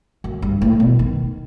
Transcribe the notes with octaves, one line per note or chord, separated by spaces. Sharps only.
F#2
G2
A2
B2
D#3